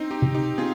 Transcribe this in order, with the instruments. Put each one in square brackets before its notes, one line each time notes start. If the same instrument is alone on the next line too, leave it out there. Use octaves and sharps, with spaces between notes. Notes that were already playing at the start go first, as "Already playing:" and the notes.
Already playing: [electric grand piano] C4 D#4
D#4 G4
[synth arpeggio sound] C3
[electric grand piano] D#4 G4
[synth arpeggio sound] C4 [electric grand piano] F4 G#4